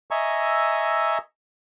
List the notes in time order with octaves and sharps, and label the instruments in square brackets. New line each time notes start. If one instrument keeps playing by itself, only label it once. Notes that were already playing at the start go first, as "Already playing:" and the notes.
[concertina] D#5 E5 G#5 A#5 C#6 E6